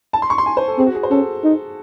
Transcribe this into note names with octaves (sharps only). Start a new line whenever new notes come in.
A5
C6
C#6
C6
G#5
C5
A4
C4 G#4
F#4
G#4
C5
C#4 A4
D#4